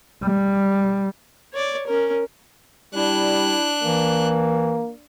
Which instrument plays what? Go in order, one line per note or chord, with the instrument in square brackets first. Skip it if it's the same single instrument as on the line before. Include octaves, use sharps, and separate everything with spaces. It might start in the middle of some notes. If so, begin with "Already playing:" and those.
[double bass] G3
[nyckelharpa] C#5 D5
C#4 A#4
[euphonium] G3 [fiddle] D4 F#6 [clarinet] E4
[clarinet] E3 [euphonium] A#3